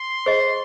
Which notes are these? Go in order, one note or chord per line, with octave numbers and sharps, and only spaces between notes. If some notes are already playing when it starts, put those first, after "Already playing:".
Already playing: C6
G#4 C5 D#5